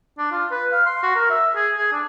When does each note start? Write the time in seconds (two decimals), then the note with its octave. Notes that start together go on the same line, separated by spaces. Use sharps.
0.18 D4
0.32 F4
0.51 B4
0.72 F5
0.86 C6
1.03 F#4
1.15 A#4
1.30 E5
1.55 G#4
1.77 G#4
1.92 D4